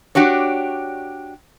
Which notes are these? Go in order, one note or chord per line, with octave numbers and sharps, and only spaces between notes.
D4 F#4 G4 C#5